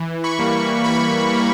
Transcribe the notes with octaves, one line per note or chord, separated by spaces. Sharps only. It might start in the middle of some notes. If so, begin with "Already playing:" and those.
Already playing: E3
B5 C#6
G3 A#3
E3 B5 C#6
G3 A#3